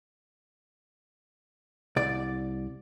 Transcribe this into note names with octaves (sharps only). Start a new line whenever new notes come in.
C2 D5